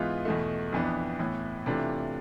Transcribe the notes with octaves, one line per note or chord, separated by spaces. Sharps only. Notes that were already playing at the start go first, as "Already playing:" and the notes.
Already playing: G#2 E3 G#3 B3 F4
E2 B2 A3
F2 E3 B3 D4
A2 E3 B3 E4
C3 E3 A3 D4 F4